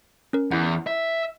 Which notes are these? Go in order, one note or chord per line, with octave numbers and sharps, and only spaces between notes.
C#4 A#4
E2 E4 F#5
E5